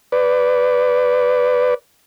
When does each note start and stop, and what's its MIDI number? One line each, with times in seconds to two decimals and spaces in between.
0.12 1.74 71
0.12 1.74 74